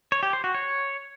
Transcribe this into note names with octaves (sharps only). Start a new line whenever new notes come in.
C#5
G4
C5
F#4
C#5